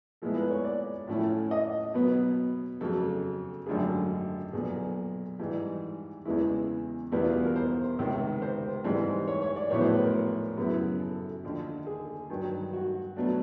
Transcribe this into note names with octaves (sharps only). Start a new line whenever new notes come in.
A#2 F3 G#3 B3 E4 A4
B4
C#5
D5
A2 F3 A3 C#4 E4
D#5
B2 F#3 B3
F2 C#3 F#3 A4
G#1 F#2 D3 F3 A3 G#4
B1 A#2 F3 G#4
G#2 E3 G3 G4
E2 C#3 E3 G#3 E4
E2 B2 G3 B3 E4
F4
F4
A#4
C5
C#2 C3 D#3
C5
G#2 E3 G3 C4
C#5
C#5
D5
A#1 A2 F#3 B3 E4 C#5
C5
B4
A#4
F#2 C#3 F#3 B3 E4
A4
D#2 D3 F3
G#4
G2 D#3 F#3
F#4
B2 F#3 A3 D4